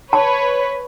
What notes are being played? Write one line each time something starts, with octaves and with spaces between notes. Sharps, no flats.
B4 C#5 A5